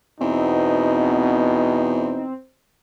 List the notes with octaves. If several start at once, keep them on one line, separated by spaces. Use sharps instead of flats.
E2 B2 C4 D#4